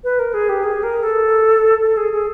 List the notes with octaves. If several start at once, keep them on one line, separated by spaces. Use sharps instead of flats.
B4
A#4
G#4
G4
G#4
A#4
A4
A4
G#4
G#4